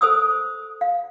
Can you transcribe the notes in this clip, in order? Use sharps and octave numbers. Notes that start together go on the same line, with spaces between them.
A4 C5 D#6 E6
F5